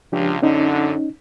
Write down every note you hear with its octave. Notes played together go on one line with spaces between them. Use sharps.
C#2 F3 D4 G4
F#2 D3 C#4 D#4